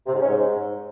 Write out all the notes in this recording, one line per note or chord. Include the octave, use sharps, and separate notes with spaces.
C3
G#2
C#4
G#2